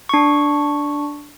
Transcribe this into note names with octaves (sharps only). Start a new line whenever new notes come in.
D4 C#6